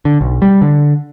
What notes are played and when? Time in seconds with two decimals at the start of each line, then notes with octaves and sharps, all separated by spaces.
0.05 D3
0.21 B1
0.42 G3
0.62 D3